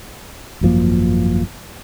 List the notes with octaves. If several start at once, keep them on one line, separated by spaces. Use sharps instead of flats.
G#1 F#2 F3 A#3